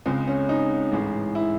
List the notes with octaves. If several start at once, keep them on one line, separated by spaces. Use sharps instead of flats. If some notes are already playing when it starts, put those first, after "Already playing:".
C#2 C#3 G#3 C4
C#4
D#4
A1 G#2 E3 G#3
E4